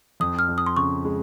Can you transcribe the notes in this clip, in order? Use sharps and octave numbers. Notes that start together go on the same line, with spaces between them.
F2 D#6
F6
F2
D#6
C6
C#3 C#6
G#3